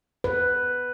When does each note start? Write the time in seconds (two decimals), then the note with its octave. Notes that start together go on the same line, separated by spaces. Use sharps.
0.24 B4